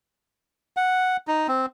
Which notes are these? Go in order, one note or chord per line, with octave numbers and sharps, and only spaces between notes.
F#5
D#4
C4